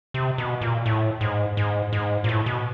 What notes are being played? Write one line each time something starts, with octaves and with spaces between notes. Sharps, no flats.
C3
B2
A#2
A2
G#2
G#2
G#2
A#2
A2
B2